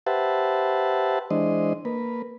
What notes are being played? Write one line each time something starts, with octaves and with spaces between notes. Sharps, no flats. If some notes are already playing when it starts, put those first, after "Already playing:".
G4 B4 C5 E5 F#5 A5
E3 G#3 D4 C5 D#5
A#3 B4